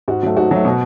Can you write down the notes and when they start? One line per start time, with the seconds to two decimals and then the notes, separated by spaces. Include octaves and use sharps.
0.08 G#2 F#4
0.23 F#3 A3
0.37 G#2 F#4
0.51 F#3 A3
0.65 B2